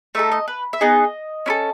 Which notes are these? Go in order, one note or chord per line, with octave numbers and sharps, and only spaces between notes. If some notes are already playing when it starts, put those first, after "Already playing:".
A3 D#4 A4 E5
D#5
B4
E5
B3 D#4 G#4 D#5
C#4 E4 A4